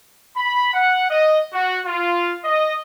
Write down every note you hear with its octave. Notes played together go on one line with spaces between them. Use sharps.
B5
F#5
D#5
F#4
F4
D#5